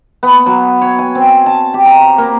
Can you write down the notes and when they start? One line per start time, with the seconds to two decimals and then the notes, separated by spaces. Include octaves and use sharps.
0.23 B3
0.46 F#3
0.81 C#5
0.99 G#5
1.15 C4
1.46 A5
1.74 G4
1.86 A#5
2.18 A#3